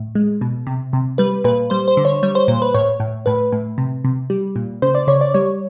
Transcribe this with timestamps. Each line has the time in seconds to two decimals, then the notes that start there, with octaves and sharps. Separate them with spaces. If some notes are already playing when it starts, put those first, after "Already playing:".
Already playing: A2
0.15 G#3
0.41 B2
0.67 C3
0.93 C3
1.18 G3 B4
1.44 A#2 B4
1.70 G3 C5
1.88 C5
1.97 D3
2.05 C#5
2.23 G3 C#5
2.35 C5
2.48 A#2 C5
2.62 B4
2.74 A2 C#5
3.00 A2
3.26 A2 B4
3.52 A2
3.78 C3
4.05 C3
4.30 G3
4.56 A#2
4.82 C#3 C5
4.95 D5
5.07 C#3 C#5
5.21 D5
5.34 G3 C#5